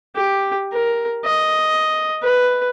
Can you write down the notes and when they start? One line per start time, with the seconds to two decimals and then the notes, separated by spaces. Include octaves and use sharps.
0.16 G4
0.73 A#4
1.25 D#5
2.23 B4